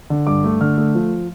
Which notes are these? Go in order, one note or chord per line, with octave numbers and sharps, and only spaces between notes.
D3
G2 D6
A3
D3 F6
A3
F3